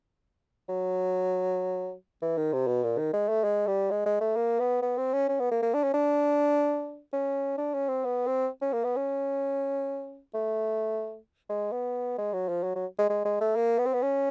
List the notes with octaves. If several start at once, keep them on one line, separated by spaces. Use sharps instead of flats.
F#3
E3
D#3
C3
B2
A#2
D#3
G#3
A3
G#3
G3
G#3
G#3
A3
A#3
B3
B3
C4
C#4
C#4
B3
A#3
A#3
D4
C#4
D4
C#4
D4
C#4
C4
B3
C4
C#4
A#3
B3
C#4
A3
G#3
B3
G#3
F#3
F3
F#3
F#3
G#3
G#3
G#3
A3
A#3
B3
C4
B3
C#4